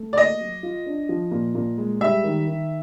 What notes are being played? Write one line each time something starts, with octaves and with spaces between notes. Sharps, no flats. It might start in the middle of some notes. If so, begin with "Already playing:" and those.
Already playing: A3
D5
A#3 D#5
F#3
F4
D4
F3
A#2
A#2
G#3
G3 E5
D#3
D#3